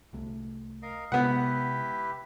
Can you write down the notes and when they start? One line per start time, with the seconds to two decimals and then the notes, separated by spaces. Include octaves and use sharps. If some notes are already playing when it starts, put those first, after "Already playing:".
0.13 C2 A3
0.82 A#4 D#5 F5
1.12 C3 G#3 B3 E4 G4 B4 F#5